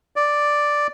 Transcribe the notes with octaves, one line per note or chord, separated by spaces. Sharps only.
D5